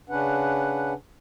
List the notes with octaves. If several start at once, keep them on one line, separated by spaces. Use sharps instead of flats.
C#3 C#4 D4 B4 F#5